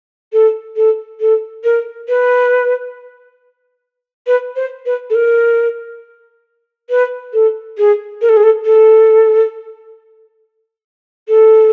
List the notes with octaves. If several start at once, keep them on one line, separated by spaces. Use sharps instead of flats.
A4
A4
A4
A#4
B4
B4
C5
B4
A4
A#4
B4
A4
G#4
A#4
A4
G#4
A4
A4
A4